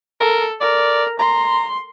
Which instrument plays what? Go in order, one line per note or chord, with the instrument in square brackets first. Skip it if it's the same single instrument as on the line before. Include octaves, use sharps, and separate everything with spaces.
[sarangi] A4 [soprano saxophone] A#4
[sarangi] A#4 [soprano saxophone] D5
[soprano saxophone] A#5 [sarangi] C6